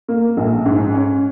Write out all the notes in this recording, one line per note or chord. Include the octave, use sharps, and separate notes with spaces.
A#3
A#1
G#2
C#4